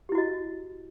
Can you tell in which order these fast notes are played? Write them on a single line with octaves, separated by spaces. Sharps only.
G4 E4 F#4 D#5